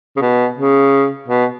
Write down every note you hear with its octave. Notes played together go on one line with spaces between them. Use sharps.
C#3
B2
C#3
B2